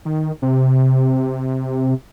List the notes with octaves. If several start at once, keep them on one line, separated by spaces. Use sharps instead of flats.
D#3
C3